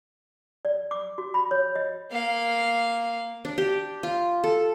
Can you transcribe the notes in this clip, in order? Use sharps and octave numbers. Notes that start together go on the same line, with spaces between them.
D5
D6
F#4
B5
C#5
D#5
A#3 F5
D4
G4
F4
A4